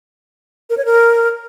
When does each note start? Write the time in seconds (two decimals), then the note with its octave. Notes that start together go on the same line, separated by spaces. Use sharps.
0.70 A#4
0.77 C#5
0.85 A#4